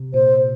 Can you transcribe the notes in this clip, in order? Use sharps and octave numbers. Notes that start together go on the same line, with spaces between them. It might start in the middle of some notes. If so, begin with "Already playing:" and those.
Already playing: C3
A#2 C5